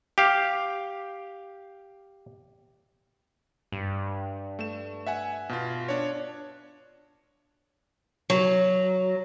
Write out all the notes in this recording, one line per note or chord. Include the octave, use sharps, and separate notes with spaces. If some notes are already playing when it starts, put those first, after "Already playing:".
G4 F5
G2
A3 E7
E5 F#5 G#5
B2 F4
D4 C#5
F#3